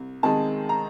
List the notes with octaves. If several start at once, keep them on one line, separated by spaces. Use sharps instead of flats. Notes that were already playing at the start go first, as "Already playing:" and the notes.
Already playing: C2
C3 D#3 G#3 A5
A#5